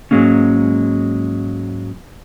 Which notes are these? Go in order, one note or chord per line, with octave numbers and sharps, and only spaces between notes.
G#2 D#3 F#3 G#3 A#3 C#4